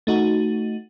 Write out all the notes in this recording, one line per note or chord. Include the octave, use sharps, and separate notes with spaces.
A3 D#4 F#4